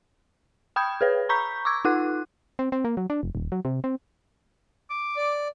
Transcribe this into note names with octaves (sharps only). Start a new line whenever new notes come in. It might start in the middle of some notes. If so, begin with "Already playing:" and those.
G5 B5 D#6 G6 G#6
G#4 B4 C#5
A#5 B5 C#6 G6 B6
C#6 D6 E6 G#6
D#4 F4 F#5 F#6
C4
C4
A#3
F#3
D4
F1
D#1
F#3
C3
C4
D6
D5